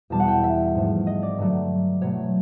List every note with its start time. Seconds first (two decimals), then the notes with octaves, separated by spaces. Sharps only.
0.10 E2 B2 G3 A5
0.20 F#5
0.28 G5
0.44 E5
0.75 G#2 F3 A3
1.07 D#5
1.23 D5
1.38 G2 D3 F#3 A3
2.01 B2 F#3 A3 C#5